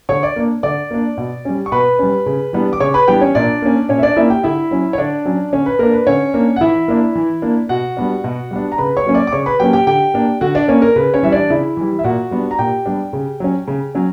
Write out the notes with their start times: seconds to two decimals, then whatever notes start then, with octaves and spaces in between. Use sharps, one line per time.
0.09 D3 C#5 C#6
0.23 D5 D6
0.36 A#3 D4
0.63 D3 D5 D6
0.91 A#3 D4
1.17 B2
1.45 G3 C#4
1.66 C#6
1.72 B2 B4 B5
1.99 G3 C#4
2.26 C#3
2.53 E3 G3 B3 D4
2.73 D6
2.80 C#3 C#5 C#6
2.94 B4 B5
3.08 E3 G3 B3 D4 G4 G5
3.21 C#4 C#5
3.35 A#2 D4 D5
3.62 A#3 C#4
3.89 A#2 C#4 C#5
3.99 E5
4.03 D4 D5
4.16 A#3 C#4 E4 E5
4.30 G4 G5
4.44 D3 E4 E5
4.71 F#3 C#4
4.93 C#5
4.98 D3 D4 D5
5.25 F#3 C#4
5.52 D3 C#4 C#5
5.66 B4
5.79 A#3 D4 A#4
5.93 B4
6.07 D3 C#4 C#5
6.34 A#3 D4
6.56 F#5
6.61 E3 E4 E5
6.88 A#3 D4
7.15 E3
7.42 A#3 D4
7.69 B2 F#4 F#5
7.97 G3 B3 D4
8.24 B2
8.51 G3 B3 D4
8.72 A#5
8.78 C#3 B4 B5
8.97 C#5 C#6
9.05 F#3 A#3 C#4
9.15 D5 D6
9.27 D6
9.32 C#3 C#5 C#6
9.46 B4 B5
9.60 F#3 A#3 C#4 G4 G5
9.73 G4 G5
9.87 D3 G4 G5
10.14 A#3 D4
10.41 D3 F#4 F#5
10.55 D4 D5
10.68 A#3 C#4 D4 C#5
10.82 A#4
10.96 C#3 B4
11.14 C#4 C#5
11.23 E3 G3 E5
11.32 D4 D5
11.50 C#3 E4 E5
11.77 E3 G3
11.99 E5
12.04 A#2 F#4 F#5
12.31 G3 B3 D4
12.51 A#5
12.59 A#2 G4 G5
12.86 G3 B3 D4
13.13 C#3
13.40 F#3 C#4
13.68 C#3
13.95 F#3 C#4